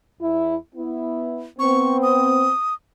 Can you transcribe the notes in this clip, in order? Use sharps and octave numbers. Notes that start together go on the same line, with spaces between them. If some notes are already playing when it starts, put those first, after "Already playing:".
E2 E4
B3 E4
B3 C4 C#6
D#6